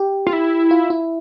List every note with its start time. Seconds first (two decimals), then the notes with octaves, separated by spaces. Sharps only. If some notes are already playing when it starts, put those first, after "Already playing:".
Already playing: G4
0.27 F4
0.33 E4
0.71 F4
0.90 E4